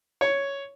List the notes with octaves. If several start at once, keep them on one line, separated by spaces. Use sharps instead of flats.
C#5